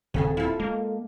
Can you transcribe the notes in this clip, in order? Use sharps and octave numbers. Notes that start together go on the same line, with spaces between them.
D#1 D#2 C#3 C4 G#4 A4 B4
E4 F4 A4
G#3 A#3